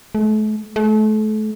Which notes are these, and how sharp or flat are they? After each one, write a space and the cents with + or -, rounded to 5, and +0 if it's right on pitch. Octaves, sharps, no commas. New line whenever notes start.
A3 -40
A3 -35